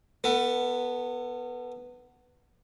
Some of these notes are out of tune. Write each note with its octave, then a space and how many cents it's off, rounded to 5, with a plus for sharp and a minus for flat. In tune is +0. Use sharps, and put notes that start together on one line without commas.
B3 +0 A4 +40